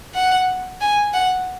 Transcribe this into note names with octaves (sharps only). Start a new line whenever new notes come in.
F#5
G#5
F#5